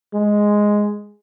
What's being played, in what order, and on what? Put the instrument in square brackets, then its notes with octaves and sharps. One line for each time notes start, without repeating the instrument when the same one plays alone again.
[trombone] G#3